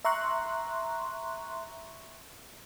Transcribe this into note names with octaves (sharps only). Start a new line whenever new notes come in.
E5 A#5 C6 C#6 F#6